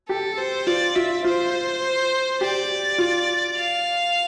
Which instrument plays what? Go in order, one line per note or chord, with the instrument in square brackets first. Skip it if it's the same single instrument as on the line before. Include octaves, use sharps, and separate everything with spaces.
[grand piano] G4 [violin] A4
[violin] C5
[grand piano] F4 [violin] D5
[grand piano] F4 [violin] E5
[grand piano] F4 [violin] C5
[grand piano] G4 [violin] D5
[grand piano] F4
[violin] F5